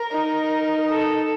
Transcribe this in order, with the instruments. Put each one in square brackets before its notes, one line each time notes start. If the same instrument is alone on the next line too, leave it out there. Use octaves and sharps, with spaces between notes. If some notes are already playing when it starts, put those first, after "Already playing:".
Already playing: [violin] A#4
[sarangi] D#4
[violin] A4